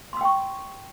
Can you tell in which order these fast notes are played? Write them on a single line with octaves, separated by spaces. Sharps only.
C6 E6 G5 C#6